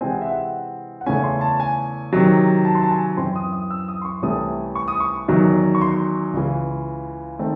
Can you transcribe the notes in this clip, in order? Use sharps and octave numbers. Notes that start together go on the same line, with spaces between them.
C3 E3 G#3 C4 G#5
F#5
E5
F#5
F#5
E2 C#3 E3 A3 C#4 G#5
C6
A5
G#5
C3 D#3 F#3
A5
C6
A5
G#5
F#2 E3 C4 C6
D#6
D#6
E6
D#6
C6
C#6
C2 C3 E3 A3 C#4 D#6
C#6
D#6
C#6
E2 D#3 F#3
C#6
C6
C#2 C#3 E3
D#3 A3 C4